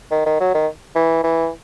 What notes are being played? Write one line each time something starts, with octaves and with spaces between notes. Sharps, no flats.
D#3
D#3
F#3
D#3
E3
E3